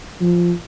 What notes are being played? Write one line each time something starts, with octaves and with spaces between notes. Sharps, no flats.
F3